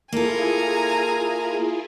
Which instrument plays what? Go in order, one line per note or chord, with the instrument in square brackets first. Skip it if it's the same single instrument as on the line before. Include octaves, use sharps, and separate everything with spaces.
[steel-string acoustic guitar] A#3 A4 [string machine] E4 F4 G#4 [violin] G#5 A#5